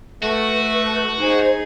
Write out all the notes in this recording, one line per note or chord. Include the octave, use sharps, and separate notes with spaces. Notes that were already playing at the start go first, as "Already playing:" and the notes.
A3 F#4 B4
D#4 G#4 C5